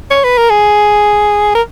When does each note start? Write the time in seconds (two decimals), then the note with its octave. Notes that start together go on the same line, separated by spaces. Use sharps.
0.10 C#5
0.24 B4
0.37 A#4
0.50 G#4
1.55 A#4